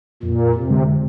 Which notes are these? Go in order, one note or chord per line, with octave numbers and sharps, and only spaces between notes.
F2 A#2
C3
D3 G#3